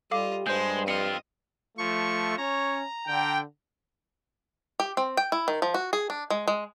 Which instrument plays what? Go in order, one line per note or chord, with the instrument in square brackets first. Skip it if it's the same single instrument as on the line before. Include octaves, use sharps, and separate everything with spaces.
[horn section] G3 [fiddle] F4 D#5 [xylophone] A4 F5 D6
[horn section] G2 [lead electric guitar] G#3 [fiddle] C5 [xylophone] G6
[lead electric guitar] C4 F4 [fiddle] D#5 [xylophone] C#7
[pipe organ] F3 C#6 [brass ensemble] A3
[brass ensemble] C#4 C#5 [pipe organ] A#5
[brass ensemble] D3 G5
[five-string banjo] G4
C4
G5
E4
D#3
F3
F#4
G#4
D4
G#3
G#3